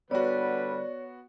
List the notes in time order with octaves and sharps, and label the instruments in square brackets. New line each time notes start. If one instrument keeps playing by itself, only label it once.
[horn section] D3 G3 B4 [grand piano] B3 F#4 [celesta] C#5 [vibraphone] D5